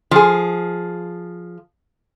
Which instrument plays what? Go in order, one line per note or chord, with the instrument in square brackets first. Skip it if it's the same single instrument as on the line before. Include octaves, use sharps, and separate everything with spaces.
[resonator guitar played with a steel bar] F3 G#4